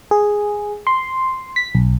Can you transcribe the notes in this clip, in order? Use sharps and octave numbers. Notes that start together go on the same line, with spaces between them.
G#4
C6
B6
B1